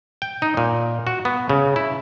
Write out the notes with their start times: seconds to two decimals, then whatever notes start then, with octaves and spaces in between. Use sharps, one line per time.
0.22 G5
0.42 D#4
0.57 A#2
1.07 F#4
1.25 B3
1.49 C#3
1.76 E4